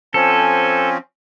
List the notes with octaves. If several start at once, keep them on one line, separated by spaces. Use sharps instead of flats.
F3 C4 C#4 A4 G#5